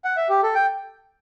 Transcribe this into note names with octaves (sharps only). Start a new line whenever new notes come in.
F#5
E5
G4
A4
G5